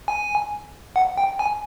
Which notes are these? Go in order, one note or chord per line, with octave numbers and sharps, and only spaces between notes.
G#5
F#5
G5
G#5